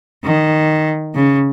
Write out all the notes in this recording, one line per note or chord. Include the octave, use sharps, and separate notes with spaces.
D#3
C#3